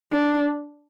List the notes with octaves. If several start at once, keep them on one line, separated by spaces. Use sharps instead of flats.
D4